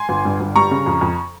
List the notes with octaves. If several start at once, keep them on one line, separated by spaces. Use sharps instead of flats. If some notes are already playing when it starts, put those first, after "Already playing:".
Already playing: G#5 C6
G1
G2
G1
G3 A#5 C#6
C#3
F2
F2